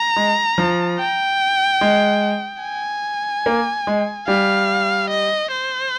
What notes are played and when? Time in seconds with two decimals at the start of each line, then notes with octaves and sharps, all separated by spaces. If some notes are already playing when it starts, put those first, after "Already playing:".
Already playing: A#5
0.16 G#3
0.58 F3
0.99 G5
1.81 G#3
2.63 G#5
3.46 A#3
3.87 G#3
4.28 G3 F5
5.10 D#5
5.51 C5